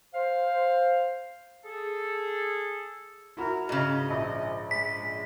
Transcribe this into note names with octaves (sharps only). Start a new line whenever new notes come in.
C5 F5
G#4 A4
E4 F#4 A#4
G#2 C#3 D#5
A#1
G#3 B6